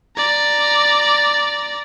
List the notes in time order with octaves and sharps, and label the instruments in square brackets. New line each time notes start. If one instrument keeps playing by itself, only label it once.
[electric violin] D5 A#5